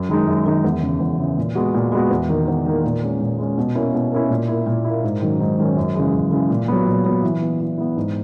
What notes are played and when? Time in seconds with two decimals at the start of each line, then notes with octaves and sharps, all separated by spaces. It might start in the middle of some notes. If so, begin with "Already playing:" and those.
Already playing: F#2
0.09 D#3 G#3 D#4
0.27 F#2
0.46 D#3 G#3 D#4
0.64 E2
0.82 C#3 E3
1.00 E2
1.19 C#3 E3
1.37 A#2
1.55 G#3 B3 F#4
1.74 A#2
1.92 G#3 B3 F#4
2.11 E2
2.29 D#3 A#3
2.48 E2
2.66 D#3 A#3
2.84 A#2
3.02 G#3 C#4
3.21 A#2
3.39 G#3 C#4
3.58 B2
3.75 A#3 C#4 E4
3.94 B2
4.12 A#3 C#4 E4
4.30 A#2
4.48 A#3 E4
4.66 A#2
4.85 E4
4.90 A#3
5.03 G#2
5.22 D#3 F#3 C#4
5.40 G#2
5.59 D#3 F#3 C#4
5.77 F#2
5.95 C#3 E3 G#3
6.13 F#2
6.31 C#3 E3 G#3
6.50 A#2
6.68 F#3 B3
6.86 A#2
7.05 F#3 B3
7.23 E3
7.41 B3 E4
7.60 E3
7.78 B3 E4
7.97 G#2